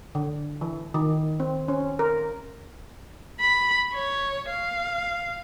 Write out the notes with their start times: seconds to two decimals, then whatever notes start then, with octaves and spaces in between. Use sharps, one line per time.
0.15 D3
0.61 E3
0.94 D#3
1.40 C4
1.68 C#4
1.99 A#4
3.40 B5
3.94 C#5
4.50 F5